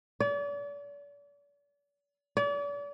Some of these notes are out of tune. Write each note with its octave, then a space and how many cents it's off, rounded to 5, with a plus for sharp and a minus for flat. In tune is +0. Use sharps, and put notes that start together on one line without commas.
D5 -40
D5 -40